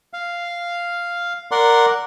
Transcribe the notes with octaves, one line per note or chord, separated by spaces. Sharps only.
F5
A#4 D5 F#5 C6